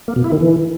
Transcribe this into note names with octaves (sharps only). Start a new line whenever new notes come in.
A#3
B2
E4
D#3
E3